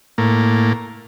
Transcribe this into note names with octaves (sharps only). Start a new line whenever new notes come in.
A2 A#3